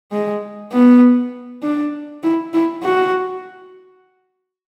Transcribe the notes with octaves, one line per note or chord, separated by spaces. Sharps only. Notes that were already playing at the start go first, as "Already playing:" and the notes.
G#3
B3
D4
E4
E4
F#4